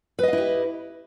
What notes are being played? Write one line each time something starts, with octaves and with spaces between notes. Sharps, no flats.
E4 G4 B4 D#5 F5